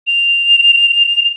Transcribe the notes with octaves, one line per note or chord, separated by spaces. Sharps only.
F7